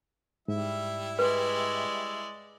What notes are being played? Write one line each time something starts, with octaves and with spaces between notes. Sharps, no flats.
G#2 G3 E4 E5
G#3 B4 D5